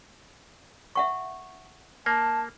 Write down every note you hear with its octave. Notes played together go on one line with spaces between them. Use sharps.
E5 F#5 C#6
A#3 A5